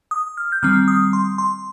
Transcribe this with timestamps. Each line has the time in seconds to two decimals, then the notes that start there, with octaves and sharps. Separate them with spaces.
0.11 D#6
0.37 F6
0.52 G6
0.63 D#3 G3 C4 F6
0.88 D#6
1.13 C6
1.38 C6